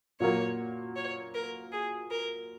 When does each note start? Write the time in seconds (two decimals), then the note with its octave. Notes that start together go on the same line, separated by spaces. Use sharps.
0.20 A#2 F#3 A#3 C#5
0.96 C#5
1.35 A#4
1.72 G#4
2.11 A#4